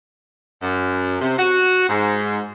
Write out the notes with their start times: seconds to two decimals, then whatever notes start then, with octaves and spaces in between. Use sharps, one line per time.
0.62 F#2
1.21 C3
1.37 F#4
1.89 G#2